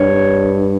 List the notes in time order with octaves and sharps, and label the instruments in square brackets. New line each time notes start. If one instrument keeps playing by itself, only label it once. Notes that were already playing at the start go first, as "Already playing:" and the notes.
Already playing: [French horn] G2 [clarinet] C#5